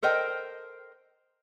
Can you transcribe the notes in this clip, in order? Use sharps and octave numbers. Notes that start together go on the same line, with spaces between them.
A4 A#4 C5 D#5 G5